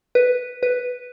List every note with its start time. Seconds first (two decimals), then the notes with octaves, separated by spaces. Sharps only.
0.15 B4
0.63 B4